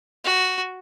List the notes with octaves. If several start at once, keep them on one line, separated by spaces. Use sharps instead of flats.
F#4